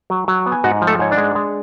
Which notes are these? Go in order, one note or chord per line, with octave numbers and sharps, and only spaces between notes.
F#3
F#3
B3
G#5
G#2 F#4 F#5
F3
A3 A4
G#2 C#5
D4 D5
G#3
G#3